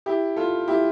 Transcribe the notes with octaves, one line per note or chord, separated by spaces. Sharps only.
E4 G4
F4 A4
E4 G4